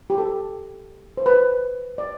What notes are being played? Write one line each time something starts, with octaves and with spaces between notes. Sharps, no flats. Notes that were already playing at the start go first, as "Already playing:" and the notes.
G4
A4
C5
B4
D5